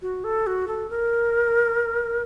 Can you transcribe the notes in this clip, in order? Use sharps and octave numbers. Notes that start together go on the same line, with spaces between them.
F#4
A4
F#4
A4
A#4